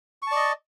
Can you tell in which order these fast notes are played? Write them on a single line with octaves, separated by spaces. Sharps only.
C#6 A5 D5 D#5